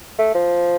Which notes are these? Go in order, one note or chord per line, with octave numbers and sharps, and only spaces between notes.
A3
F3